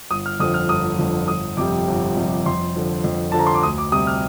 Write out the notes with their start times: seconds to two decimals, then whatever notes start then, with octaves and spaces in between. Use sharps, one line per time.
0.11 G1 D#6
0.26 F6
0.40 F2 D3 F3 D#6
0.54 F6
0.69 G1 D#6
0.98 F2 D3 F3
1.28 G1 D#6
1.57 F2 C3 G3 D6
1.87 G1
2.16 F2 C3 G3
2.46 F2 C6
2.76 D3 F3
3.04 F2
3.32 D3 F3 A5
3.39 A#5
3.47 C6
3.55 D6
3.63 D2 D#6
3.78 D6
3.92 C3 G3 D#6
4.07 F6